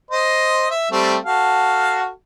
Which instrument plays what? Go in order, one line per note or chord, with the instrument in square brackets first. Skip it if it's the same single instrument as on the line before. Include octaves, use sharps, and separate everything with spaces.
[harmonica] C5 D#5
E5
G3 A3 C4
F#4 A4 F5